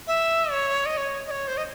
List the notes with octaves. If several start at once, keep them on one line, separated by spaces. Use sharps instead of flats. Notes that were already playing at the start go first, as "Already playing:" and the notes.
E5
C#5
D#5
C#5
D#5
C#5
C5
D#5